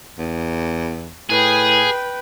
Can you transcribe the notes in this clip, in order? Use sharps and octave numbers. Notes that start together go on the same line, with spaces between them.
E2
A2 G#4 B4 G5